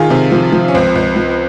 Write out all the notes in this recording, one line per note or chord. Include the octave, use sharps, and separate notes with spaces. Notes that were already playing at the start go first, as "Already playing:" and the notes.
Already playing: D#3 F4 G#4
C3
F3
F3
C#4
C#2 C4
C#2
F3